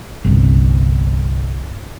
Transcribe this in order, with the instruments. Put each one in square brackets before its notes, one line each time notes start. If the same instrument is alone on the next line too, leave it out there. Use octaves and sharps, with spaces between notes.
[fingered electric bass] G1 C2